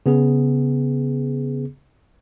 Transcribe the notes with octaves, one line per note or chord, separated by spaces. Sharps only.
C#3 B3 G#4